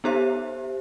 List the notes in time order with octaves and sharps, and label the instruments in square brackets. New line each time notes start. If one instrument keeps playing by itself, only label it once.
[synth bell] B3 D#4 G4 C5 E5